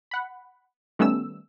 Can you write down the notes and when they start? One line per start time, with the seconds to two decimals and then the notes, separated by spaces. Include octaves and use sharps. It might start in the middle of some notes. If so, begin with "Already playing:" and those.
0.11 F#5 B5
0.99 D#3 G3 A3 B3 C#4 E6